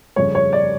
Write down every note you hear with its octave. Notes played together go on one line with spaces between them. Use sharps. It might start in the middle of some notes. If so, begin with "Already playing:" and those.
G1 F2 C#3 C#5
C#5
D5